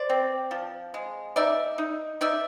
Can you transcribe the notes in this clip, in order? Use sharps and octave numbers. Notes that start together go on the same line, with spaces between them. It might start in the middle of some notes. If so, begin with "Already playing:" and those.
Already playing: C5 D5
C4
F3
G#3
D#4 D5 E5
D#4
D#4 D5 E5